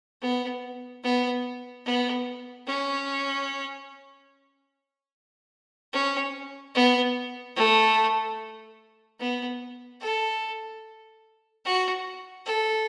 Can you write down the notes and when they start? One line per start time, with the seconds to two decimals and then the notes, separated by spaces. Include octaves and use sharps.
0.22 B3
1.04 B3
1.86 B3
2.67 C#4
5.93 C#4
6.75 B3
7.56 A3
9.19 B3
10.01 A4
11.65 F#4
12.46 A4